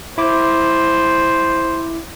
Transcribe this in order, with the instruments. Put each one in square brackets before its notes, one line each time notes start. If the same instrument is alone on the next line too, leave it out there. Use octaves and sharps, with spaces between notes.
[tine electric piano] E4 D6 [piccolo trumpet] C5